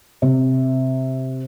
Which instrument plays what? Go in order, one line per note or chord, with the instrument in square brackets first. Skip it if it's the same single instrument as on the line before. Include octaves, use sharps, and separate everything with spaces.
[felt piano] C3